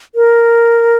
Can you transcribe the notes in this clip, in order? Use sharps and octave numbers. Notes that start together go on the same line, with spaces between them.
A#4